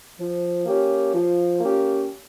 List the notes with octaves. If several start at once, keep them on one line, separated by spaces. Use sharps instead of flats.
F3
A#3 C#4 G4
F3
A#3 C#4 G4